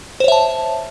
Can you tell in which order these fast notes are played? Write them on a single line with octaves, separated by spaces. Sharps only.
C5 C#5 E5 A5